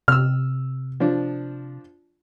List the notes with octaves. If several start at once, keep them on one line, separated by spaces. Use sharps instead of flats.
C3 E6 F6
F3 D4